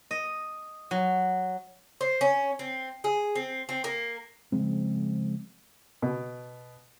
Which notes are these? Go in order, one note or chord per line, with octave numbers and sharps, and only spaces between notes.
D#5
F#3
C5
C#4
C4
G#4
C4
C4
A#3
C#3 F3 G#3 C4
B2